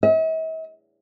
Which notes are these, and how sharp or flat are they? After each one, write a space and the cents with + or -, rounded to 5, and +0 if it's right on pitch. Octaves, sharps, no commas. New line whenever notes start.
E5 -45